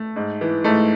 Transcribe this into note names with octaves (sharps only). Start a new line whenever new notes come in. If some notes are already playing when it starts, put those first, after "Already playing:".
Already playing: A3
G#2
E3
G#2 A3